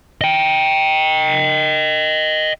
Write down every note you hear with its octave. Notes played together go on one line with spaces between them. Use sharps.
D#5 G5